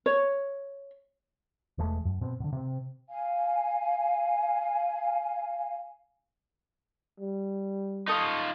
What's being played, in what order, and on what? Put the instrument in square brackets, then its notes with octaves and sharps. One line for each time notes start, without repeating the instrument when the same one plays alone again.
[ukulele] C#5
[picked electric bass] E1 E3 G#3 A3
F#2
B2 C4
B2 D3
C3 C4
[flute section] F5 G#5
[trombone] G3
[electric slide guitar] D#4 F4 [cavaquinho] A4 C#6 D#6